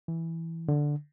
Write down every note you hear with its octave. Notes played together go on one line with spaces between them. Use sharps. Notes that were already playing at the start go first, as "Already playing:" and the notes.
E3
D3